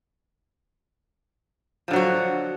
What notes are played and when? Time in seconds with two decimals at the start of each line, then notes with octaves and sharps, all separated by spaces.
1.88 F3
1.91 D3
1.93 F#3
1.96 F#4